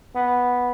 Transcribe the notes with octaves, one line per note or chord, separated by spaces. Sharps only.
B3